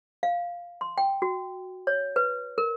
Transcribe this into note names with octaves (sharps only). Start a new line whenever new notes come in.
F5
C6
G5
F#4
C#5
B4
A#4